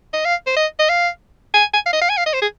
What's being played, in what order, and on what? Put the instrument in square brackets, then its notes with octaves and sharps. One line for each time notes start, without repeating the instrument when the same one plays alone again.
[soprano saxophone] D#5
F5
C5
D#5
D#5
F5
G#5
G#5
F5
D#5
F5
G#5
F5
D#5
C5
G#4